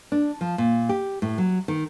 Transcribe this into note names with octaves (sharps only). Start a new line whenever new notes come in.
D4
F3
A#2
G4
A2
F#3
D#3